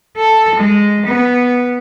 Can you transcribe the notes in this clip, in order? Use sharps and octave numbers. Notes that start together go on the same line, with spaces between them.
A4
G#3
B3